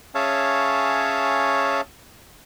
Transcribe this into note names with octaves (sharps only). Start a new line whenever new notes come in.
C#4 G#4 C#5 E5 F5 A5